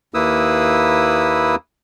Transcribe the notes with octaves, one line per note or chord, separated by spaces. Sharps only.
D#2 A#3 E4 B4 D#6 E6